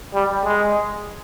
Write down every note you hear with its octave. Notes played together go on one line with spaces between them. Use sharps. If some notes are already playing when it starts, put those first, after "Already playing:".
G3
G#3